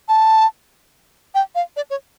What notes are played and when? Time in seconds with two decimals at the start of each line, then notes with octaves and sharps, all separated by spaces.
0.08 A5
1.35 G5
1.55 F5
1.76 D5
1.90 C#5